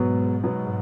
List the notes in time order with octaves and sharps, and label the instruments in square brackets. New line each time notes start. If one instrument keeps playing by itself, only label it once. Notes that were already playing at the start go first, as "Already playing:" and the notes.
Already playing: [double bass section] G#2 [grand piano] B2 F#3 B3
[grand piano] B2 F#3 B3